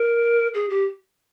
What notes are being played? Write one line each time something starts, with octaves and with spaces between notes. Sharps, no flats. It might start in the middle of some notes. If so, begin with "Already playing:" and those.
Already playing: A#4
G#4
G4